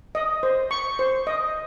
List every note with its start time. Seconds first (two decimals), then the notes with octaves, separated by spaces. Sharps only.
0.15 D#5
0.43 C5
0.71 C#6
0.99 C5
1.27 D#5